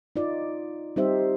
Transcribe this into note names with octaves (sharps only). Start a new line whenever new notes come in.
D#4 F4 D5
G3 C4 D#4 G4 C5 E5